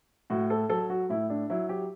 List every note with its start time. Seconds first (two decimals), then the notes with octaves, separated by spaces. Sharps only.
0.30 A2 F#4
0.50 A4
0.70 F#3 A4
0.90 F#4
1.09 A2 E4
1.30 D4
1.50 F#3 E4
1.69 G4